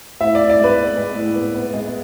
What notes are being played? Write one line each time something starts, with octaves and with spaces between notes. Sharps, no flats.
A2 E5
D5
A2
D5
G#3 B4
B3
G#3
A2
B3
B3
G#3